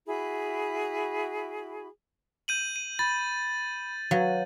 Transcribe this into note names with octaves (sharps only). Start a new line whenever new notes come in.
E4 F#4 G#4 B5
G6 D#7 F#7
D#7
B5 A6
F#3 F#4 B4 F5